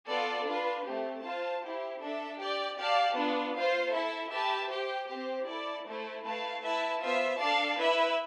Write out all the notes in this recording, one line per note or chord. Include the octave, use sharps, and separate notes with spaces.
B3 F4 A4 D5
D4 F4 B4
A3 C4 G4
F4 C5 F5 A5
E4 G4 C5
D4 A4 E5
G4 D5 G5
G4 D5 F5 A5
B3 D4 F4
F4 C5 F5
E4 A4 E5
G4 B4 E5 A5
G4 C5 G5
C4 G4 C5
E4 A4 D5
A3 E4 A4 C5
A3 E4 B4 F5 A5
E4 B4 E5 A5
B3 F4 C5 E5
D4 A4 D5 F5 A5
E4 B4 E5